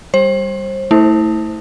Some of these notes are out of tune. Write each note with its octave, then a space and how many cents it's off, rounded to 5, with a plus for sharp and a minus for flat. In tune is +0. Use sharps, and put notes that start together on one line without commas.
G3 +0 C5 +30
A3 +10 E4 -30 C5 +0